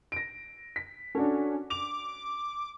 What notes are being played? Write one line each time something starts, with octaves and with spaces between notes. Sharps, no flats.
A#6 D7
B6
C#4 D4 F#4 A4
D6 F7